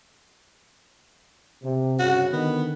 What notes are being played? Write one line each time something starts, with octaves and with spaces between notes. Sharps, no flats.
C3
G2 C#3 F#4
D3 D#3 B3